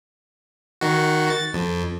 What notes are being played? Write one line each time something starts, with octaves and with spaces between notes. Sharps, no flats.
D#3 F#4
A6
F2